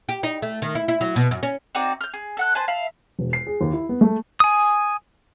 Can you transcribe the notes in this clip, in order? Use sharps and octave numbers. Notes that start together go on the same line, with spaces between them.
G4
D#4
A3
D#3
E4
E4
F#3
B2
F#2
C#4
C4 D#4 F#4 D5
F6 G6
G#4
A4 F#5 F#6
B4 C5 G#5 A5
E5 F5 B5
E1
C7
G#4
D#2
E4
B3
A3
G#5 D#6